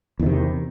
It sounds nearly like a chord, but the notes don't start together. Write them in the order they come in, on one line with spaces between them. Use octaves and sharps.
E2 D#3 C3